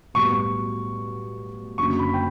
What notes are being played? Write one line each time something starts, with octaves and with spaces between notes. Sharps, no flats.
B1 A2 G3 B3 C#6
F#1 F#2 D3 F#3 C#6
B5
G5